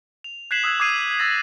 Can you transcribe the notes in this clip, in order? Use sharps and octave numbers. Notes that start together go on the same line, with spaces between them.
F7
F#6 G#6 B6 C7 E7 F#7
D#6 E6 F#6 G#6
D6 D#6 G#6 C7 D#7
D#6 E6 A6 A#6